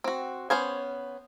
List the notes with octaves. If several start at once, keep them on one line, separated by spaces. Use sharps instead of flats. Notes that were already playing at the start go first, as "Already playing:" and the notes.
C4 F#4
B3 C#4 C5 G#5